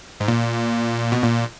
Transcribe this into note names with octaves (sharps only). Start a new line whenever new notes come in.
G#2
A#2
B2
A#2